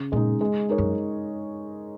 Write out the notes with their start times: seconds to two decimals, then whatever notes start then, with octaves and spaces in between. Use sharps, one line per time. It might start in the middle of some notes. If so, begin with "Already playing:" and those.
Already playing: C#3
0.12 A#2 G#3 D#4
0.41 G#3
0.69 D#4 A#4 C#5
0.78 F#2